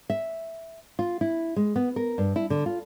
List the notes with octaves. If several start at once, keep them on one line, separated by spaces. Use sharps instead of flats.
E5
F4
E4
G#3
B3
A#4
G2
E4
D3
F4